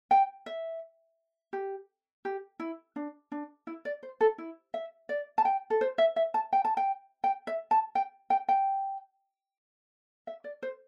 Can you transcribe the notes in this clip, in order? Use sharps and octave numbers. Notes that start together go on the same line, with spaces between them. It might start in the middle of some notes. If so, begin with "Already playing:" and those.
G5
E5
G4
G4
E4
D4
D4
E4
D5
C5
A4
E4
E5
D5
A5
G5
A4
C5
E5
E5
A5
G5
A5
G5
G5
E5
A5
G5
G5
G5
E5
D5
C5